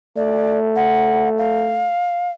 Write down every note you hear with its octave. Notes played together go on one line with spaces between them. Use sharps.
A3 D5
F#5
F5